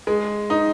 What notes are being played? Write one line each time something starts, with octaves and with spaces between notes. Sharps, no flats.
G#3
D#4